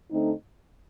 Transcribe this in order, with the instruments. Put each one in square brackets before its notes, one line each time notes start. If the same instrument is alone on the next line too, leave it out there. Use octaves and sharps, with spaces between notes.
[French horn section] D3 A3 C4 D#4